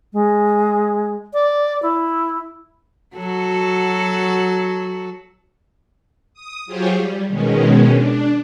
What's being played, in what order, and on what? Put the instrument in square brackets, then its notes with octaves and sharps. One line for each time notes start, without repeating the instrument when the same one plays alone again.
[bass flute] G#3
D5
E4
[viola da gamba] F#3 F#4 A4
[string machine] D#6
F#3 F4 G4 G#4 C5 C#5
G3
B2 D#3 G#3 C#4
D4